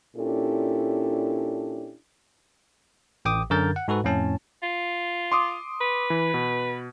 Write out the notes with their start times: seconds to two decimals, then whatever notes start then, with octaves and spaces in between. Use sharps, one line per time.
0.17 A#2 C#4 D4 E4 G4 A4
3.25 A1 G5 D6 D#6
3.50 F#2 D3 A#4 G6 A6
3.76 F#5
3.88 G#2 F#4 A4 B4
4.04 F2 A2 C#4 A5
4.63 F4
5.32 C6 D6 D#6
5.81 B4
6.10 E3
6.34 B2